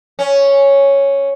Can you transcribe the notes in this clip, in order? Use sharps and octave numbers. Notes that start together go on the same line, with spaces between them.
C#4